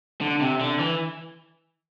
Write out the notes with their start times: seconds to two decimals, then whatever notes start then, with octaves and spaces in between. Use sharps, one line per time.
0.21 D3
0.41 C3
0.60 D3
0.79 E3